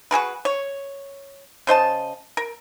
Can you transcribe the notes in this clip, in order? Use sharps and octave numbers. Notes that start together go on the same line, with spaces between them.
F#4 G#4 A#4 B4
C#5
C#3 C5 D#5 A5
A#4